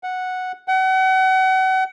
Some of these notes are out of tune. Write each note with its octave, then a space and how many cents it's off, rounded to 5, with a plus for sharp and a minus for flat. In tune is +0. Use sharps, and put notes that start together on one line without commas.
F#5 -5
F#5 +35